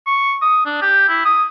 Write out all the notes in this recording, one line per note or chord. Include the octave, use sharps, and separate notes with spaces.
C#6
D#6
D4
G4
E4
D#6